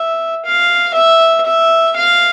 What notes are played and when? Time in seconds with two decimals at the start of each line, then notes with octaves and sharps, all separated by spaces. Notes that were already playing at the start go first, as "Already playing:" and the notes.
Already playing: E5
0.45 F5
0.94 E5
1.46 E5
1.96 F5